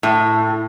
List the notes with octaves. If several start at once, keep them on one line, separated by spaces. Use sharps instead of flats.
A2